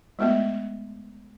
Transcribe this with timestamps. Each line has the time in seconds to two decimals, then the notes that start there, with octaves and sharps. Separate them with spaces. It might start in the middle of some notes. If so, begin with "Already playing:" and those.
0.19 G#3 A3 B3